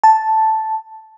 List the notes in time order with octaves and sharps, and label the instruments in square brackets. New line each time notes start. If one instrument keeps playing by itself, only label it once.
[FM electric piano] A5